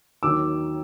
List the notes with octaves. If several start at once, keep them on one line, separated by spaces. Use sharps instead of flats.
D#2 D#3 F#3 D6 E6